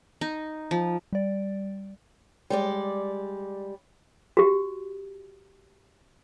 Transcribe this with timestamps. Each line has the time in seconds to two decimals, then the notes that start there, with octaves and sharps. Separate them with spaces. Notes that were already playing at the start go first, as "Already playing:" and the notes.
0.21 D#4
0.71 F3
1.13 G3 D5
2.50 G3 G#3 D5
4.37 F#4 G4